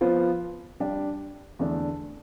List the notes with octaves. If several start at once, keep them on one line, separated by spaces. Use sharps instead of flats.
F3 B3 F4 C5 F5
G3 D4 G4
E2 D3 A3 D4